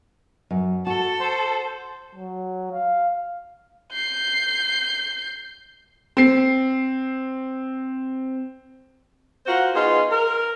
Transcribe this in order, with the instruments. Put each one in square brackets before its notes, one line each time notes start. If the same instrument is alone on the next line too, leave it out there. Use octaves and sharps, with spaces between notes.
[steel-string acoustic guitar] F#2
[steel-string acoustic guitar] F#4 [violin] A4
[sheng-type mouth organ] C5
[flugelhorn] F#3
F5
[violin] G6 C7
[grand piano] C4 C7
[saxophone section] F4 F#4 A#4 C5 F#5
B3 D#4 F4 G#4
A#4